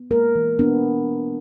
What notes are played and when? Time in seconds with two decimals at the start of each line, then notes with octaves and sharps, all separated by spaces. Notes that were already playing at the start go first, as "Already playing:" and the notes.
Already playing: B3
0.11 G#3 A#3 A#4
0.35 E3
0.59 B3 D4